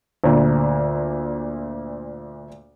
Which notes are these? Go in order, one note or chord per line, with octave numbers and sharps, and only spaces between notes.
D2 A#2